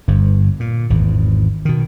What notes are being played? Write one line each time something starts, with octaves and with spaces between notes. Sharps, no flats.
G1 G2
A#2
G#1 E2
B2 D#3